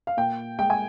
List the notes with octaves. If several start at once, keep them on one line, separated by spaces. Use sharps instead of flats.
F5
A#2 G5
G#3 G5
G#5